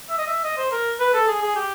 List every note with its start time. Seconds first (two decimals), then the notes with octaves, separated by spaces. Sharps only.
0.10 E5
0.19 D#5
0.27 E5
0.44 D#5
0.58 C5
0.72 A#4
1.00 B4
1.14 A4
1.28 G#4
1.42 G#4
1.56 G4